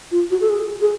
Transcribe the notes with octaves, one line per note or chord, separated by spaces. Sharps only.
F4
F#4
A4
G#4
G#4